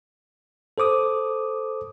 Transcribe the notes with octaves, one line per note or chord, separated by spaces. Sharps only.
A4 C5 D6 D#6